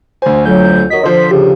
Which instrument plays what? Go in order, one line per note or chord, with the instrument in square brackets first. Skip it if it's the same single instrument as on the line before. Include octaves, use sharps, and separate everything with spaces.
[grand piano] D2 G#5 [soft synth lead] C5
[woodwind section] F2 F#3 [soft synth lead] G6
[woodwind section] D#2 F#3 D#5 [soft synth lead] B6
[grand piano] D3 F3 [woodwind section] C5
[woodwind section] C#3 [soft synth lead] G4